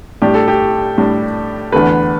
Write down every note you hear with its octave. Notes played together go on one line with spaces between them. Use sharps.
A2 G3 D4 G4
A4
G4
A2 G3 D4
E2 D3 A3 B4